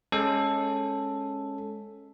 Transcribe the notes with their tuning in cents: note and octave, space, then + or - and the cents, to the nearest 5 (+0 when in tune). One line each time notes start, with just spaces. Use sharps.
G#3 +10 C#4 -10 A4 +0